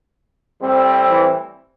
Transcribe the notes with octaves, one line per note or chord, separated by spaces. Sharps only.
A2 G3 C4
E3 E4